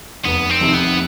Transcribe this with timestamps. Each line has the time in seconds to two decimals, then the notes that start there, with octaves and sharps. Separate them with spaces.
0.25 F1 B3
0.50 C4
0.61 F2 C3 D#3
0.74 B3